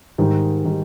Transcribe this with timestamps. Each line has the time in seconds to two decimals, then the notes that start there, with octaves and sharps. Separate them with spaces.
0.18 G#2 D#3 G3
0.65 D#3 G3